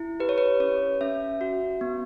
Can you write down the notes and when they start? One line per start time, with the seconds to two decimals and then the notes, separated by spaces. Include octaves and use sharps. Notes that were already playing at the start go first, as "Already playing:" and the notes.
Already playing: E4
0.20 G4 B4
0.29 C#5
0.38 B4
0.60 C#4 C#5
1.01 C#4 E5
1.41 F#4
1.81 B3